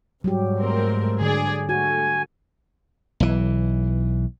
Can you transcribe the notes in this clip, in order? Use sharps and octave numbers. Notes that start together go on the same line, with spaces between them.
G#2 F#3 G3 G4
A3 C4 A#4
D3 G#4 D5
A3 F#4 G#5
B1 E3